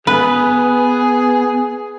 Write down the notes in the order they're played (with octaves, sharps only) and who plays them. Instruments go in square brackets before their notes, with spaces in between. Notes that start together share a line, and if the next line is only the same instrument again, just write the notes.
[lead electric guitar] B3 [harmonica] G#4 [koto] B4